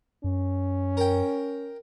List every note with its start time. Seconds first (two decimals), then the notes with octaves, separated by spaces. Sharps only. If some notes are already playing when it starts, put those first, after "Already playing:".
0.24 F#2 C#4
0.97 A#4 G5